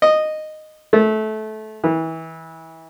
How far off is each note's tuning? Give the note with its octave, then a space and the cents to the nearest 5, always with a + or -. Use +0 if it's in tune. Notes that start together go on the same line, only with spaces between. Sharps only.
D#5 -10
A3 -20
E3 -25